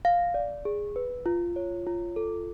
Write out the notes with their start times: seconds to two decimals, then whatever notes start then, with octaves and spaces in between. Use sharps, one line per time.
0.05 F5
0.34 D5
0.65 G#4
0.96 B4
1.26 F4
1.56 C#5
1.87 F4
2.16 A4